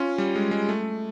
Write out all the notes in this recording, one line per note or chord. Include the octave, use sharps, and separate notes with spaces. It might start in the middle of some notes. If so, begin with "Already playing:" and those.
Already playing: C#4 F4
G3
G#3
G#3
A3